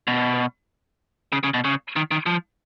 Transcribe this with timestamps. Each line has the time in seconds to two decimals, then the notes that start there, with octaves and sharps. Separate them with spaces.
0.08 B2
1.32 C#3
1.43 C#3
1.54 B2
1.64 C#3
1.96 D#3
2.11 D#3
2.26 F3